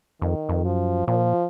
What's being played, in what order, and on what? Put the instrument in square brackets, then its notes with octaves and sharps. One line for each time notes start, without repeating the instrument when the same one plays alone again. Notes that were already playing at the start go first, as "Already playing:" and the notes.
[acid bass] F2 [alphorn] D#3
[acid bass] F2
[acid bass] F#2 [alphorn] F3
[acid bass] A#2 [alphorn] F3